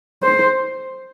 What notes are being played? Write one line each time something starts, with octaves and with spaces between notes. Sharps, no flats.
C5